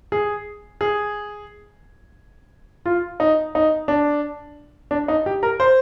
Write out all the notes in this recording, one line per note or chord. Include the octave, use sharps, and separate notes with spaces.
G#4
G#4
F4
D#4
D#4
D4
D4
D#4
G4
A#4
C5